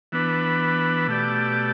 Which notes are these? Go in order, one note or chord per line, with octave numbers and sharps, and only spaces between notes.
E3 B3 D4 B4
B2 A3 G4 D5